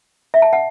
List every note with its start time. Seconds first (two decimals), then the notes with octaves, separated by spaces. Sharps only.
0.34 E5
0.42 A5
0.53 F#5